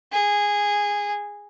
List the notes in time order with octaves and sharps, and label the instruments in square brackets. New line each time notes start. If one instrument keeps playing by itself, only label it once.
[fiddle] G#4